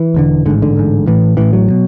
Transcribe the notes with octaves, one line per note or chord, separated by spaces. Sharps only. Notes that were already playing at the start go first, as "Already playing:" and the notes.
Already playing: E3
E1 D2 D3
A1 G#2 D3
D3
A1 G#2
A1 A2 E3
A1 A2 E3
F#3
B2